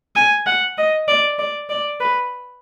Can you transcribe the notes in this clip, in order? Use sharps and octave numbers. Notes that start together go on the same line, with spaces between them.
G#5
F#5
D#5
D5
D5
D5
B4